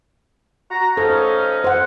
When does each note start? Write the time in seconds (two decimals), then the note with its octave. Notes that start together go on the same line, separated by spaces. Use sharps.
0.70 F#4 A#5
0.97 F3 C#4 D#4 A4
1.64 C5 F#5